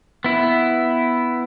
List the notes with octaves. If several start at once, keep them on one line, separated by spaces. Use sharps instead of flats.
B3 E4